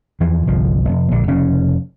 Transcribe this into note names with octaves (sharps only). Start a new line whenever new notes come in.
E2 E3 F3
G1 C2 F3
F1
A#1 D3
F1 C#3 C#4